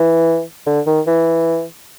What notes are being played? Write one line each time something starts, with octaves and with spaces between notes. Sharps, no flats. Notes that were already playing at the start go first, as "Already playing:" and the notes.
Already playing: E3
D3
D#3
E3